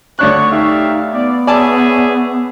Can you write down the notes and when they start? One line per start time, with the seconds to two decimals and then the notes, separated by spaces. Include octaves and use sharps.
0.19 D2 D4 C#5 C#6 F#6
0.50 D#4 G4 E5 F5
1.13 B3 D5
1.47 G#4 C#5 D5 E5 G#5 A5